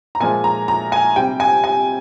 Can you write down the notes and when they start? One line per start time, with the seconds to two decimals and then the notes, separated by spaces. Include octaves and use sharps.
0.15 A#5
0.20 A#2 F3 G#3 G#5
0.44 A#5
0.68 A#5
0.92 G#5
1.16 C3 G3 G5
1.40 G#5
1.64 G#5